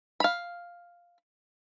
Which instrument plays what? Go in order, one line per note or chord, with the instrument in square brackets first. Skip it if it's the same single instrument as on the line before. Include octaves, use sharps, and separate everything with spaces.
[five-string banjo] F5 B5